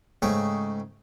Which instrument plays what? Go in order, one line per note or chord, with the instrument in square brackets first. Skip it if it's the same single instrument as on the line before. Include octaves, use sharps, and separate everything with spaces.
[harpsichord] G#2 C#3 A3 G5 C#6